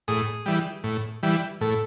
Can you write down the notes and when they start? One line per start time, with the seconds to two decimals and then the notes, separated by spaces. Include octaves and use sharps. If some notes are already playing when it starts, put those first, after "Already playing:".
0.08 A2 G#4
0.46 E3 G3
0.84 A2
1.23 E3 G3
1.61 A2 A4